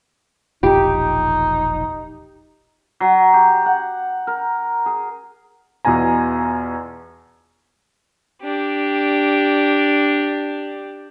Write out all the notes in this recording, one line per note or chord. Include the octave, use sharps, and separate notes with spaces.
E1 A#1 D#4 F4 G4
F#3
G4
F#5
A#4
G#4
E2 B2 F4 G#5 A#5
D4 G4